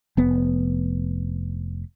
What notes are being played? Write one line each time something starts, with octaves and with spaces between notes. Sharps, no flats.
F1 B3